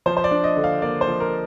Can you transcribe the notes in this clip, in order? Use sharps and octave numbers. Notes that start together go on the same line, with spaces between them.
F3 C5
C5
D5
D4
D#5
D3
F5
A#3 D5
C5
F3
A#4